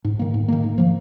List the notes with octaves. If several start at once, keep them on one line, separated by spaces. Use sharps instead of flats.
G#2
D#3 A#3
G#2
D#3 A#3
G#2
F3 A#3